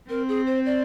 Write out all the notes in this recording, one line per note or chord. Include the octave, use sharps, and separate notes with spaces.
C4 A#4
G#4
C5
D5